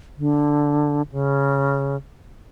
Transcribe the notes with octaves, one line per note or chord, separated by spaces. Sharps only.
D3
C#3